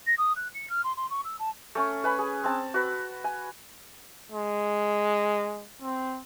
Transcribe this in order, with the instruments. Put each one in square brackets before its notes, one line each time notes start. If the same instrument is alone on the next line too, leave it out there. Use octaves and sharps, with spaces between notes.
[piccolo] A#6
D#6
F#6
C#7
F6
C6
C6
C#6
E6
A5
[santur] A3 C#4 C#6
B4 G#5 B5
G#4
C4 A5
F#4 B4
G#5
[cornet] G#3
C4